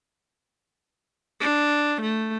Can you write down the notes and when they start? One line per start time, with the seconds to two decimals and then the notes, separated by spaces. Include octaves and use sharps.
1.41 D4
2.01 A3